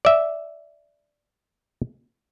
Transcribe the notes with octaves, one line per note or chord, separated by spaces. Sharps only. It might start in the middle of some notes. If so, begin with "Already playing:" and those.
D5 E5